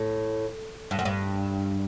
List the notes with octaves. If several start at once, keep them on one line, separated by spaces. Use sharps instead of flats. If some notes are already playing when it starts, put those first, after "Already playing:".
Already playing: A2
G2
F#2
G2